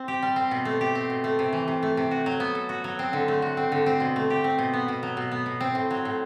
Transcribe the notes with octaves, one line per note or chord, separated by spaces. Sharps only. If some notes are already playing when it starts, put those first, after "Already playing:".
Already playing: C4
G4
G3
C4
B2
A3
G4
C4
B2
A3
C3
E3
C3
A3
C3
F#4
F#3
B3
A4
F#4
F#3
C4
D3
A3
F#4
C4
D3
C4
B2
A3
G4
C4
B2
B3
B2
F#3
B2
B3
B2
C4
A2
F#3
A2